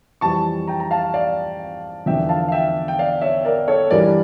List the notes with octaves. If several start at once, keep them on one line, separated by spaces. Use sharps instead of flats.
F2 E3 G3 A5 C#6
G5 A#5
A#5
F5 A5
D5 F5
E2 D3 F3 E5 G5
F5 A5
F5
E5 G5
G5
D5 F5
C#5 E5
A#4 D5
A4 C#5
G2 E3 G3 A#4 D5